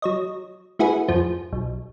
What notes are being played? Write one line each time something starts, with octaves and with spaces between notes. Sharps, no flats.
F#3 C#5 D#5
A3 E4 F#4 G#4 B4
F2 F3
B1